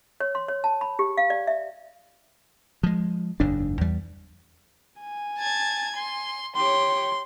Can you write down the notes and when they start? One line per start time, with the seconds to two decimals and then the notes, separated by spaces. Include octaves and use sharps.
0.20 C#5
0.35 C6
0.48 C#5
0.64 A5
0.81 B5
0.99 G4
1.17 F5
1.30 D5
1.47 E5
2.83 F3 G#3
3.40 F#1 E2 G#2 D4
3.81 E2 G3
5.01 G#5
5.38 A5 G#6
5.96 C6
6.56 G4 C#5 C6